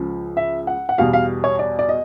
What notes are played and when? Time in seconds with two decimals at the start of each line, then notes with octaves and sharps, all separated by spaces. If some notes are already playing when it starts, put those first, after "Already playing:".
Already playing: C#2 C#3 F3
0.37 E5
0.67 F#5
0.89 F#5
0.98 E2 B2 G3 F5
1.13 F5
1.44 C#5
1.59 D5
1.79 D5
1.89 D#5